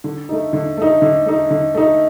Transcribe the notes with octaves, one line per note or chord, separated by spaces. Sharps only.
D3
A3 D#4
D3
A3 D#4
D3
A3 D#4
D3
A3 D#4